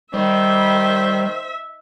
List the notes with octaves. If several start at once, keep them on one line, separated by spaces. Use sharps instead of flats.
D#3 G3 C5 E5